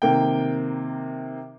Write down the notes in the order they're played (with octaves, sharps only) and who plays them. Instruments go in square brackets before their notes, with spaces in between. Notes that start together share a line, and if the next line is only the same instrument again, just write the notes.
[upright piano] C3 D#3 A#3 G5